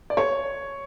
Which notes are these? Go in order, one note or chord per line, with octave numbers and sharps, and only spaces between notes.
D5
C#5